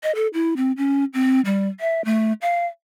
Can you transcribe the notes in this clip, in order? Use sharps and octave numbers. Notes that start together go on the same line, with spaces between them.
D#5
A4
E4
C4
C#4
C4
G3
E5
A3
F5